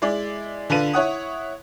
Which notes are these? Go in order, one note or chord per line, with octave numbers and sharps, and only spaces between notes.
G#3 E4 D5
D3 D4 F4 B4 D#7
E4 C#5 F#5 D#6